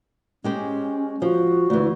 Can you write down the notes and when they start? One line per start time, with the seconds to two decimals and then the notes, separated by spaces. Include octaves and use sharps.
0.44 G#3 C#4 G4 C5
1.22 F3 F#4
1.70 D2 E3